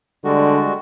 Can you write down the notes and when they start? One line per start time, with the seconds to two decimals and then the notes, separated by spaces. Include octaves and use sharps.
0.25 D3 G3 G#3 F#4